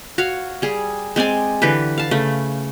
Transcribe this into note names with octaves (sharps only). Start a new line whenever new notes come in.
F#4 C#5 F5
G3 G#4
G#3 C4 D5 G#5
D3 E3 G4 B4
F5 A5
C#3 A3